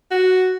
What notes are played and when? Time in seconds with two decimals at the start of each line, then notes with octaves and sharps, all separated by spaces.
0.11 F#4